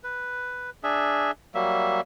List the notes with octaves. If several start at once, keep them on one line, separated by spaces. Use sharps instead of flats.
B4
D4 G#4 E5
F#3 G3 A#3 E5